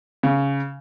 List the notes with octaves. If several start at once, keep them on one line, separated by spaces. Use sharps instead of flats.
C#3